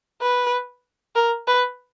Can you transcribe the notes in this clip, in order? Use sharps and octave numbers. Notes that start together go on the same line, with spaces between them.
B4
A#4
B4